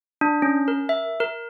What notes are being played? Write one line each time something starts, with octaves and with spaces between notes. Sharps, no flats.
D4
C#4
A#4
E5
A#4